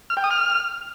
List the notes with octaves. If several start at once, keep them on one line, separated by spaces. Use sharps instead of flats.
F6
G5
D#6
F6